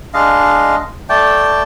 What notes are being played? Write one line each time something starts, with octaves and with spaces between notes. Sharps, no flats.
G#3 D4 D#5 F5
A3 D5 G5 A5